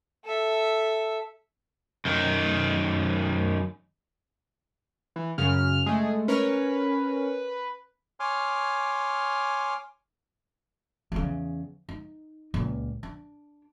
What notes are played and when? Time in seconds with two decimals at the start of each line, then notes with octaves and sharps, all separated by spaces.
0.24 A4 E5
2.05 F#2 D#3
5.16 E3
5.38 F#2 C#3 C#4 F6
5.86 G#3 A3 G#4
6.28 C#4 A#4 B4 C#5
8.20 C#5 G#5 C6 D6 F6
11.12 E2 C#3
11.89 D#4
12.54 C#2 A#2
13.03 D4